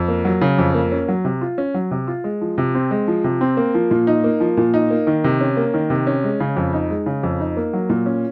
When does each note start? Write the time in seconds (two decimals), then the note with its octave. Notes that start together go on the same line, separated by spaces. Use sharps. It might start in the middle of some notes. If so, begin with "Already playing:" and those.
Already playing: F2
0.08 A#3
0.25 F#3
0.41 C#3
0.58 F2
0.74 A#3
0.92 C#4
1.08 F#3
1.25 C3
1.41 F4
1.58 C#4
1.74 F#3
1.91 C3
2.07 F4
2.24 G#3
2.41 F3
2.58 C3
2.75 C4
2.91 G#3
3.08 F3
3.24 C3
3.41 C4
3.57 A#3
3.74 F3
3.91 A#2
4.07 D#4
4.24 A#3
4.40 F3
4.57 A#2
4.74 D#4
4.90 A#3
5.07 D#3
5.24 C3
5.41 C#4
5.57 A#3
5.74 D#3
5.90 C3
6.07 C#4
6.24 G#3
6.40 C#3
6.56 F2
6.73 D#4
6.90 G#3
7.06 C#3
7.23 F2
7.40 D#4
7.57 A#3
7.73 F#3
7.90 A#2
8.06 C#4